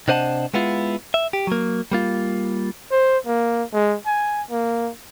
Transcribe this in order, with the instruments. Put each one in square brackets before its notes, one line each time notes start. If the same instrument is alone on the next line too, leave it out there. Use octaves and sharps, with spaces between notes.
[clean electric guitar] C3 D4 C5 D#5 F#5 A5
G#3 B3 E4 F4
E5
G4
F#3 A#3
G3 A#3 F4
[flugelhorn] C5
A#3
G#3
G#5
A#3